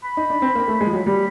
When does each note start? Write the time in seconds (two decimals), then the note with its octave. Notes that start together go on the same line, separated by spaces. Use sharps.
0.04 B5
0.17 D#4
0.30 D4
0.42 C4
0.55 A#3
0.68 A3
0.81 G#3
0.87 F3
0.93 F#3
1.06 G3 B5